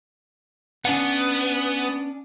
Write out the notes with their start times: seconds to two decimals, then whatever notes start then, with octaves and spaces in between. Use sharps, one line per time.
0.85 B3 C#4 D4 F#5